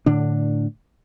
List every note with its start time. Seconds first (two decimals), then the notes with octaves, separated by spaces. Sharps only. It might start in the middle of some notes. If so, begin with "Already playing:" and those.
0.06 A2 D3 D4